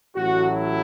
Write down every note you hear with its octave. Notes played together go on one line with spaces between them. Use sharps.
A1 A2 F#3 F#4
E4